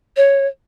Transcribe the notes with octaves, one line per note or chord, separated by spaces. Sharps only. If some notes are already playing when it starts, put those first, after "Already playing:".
C#5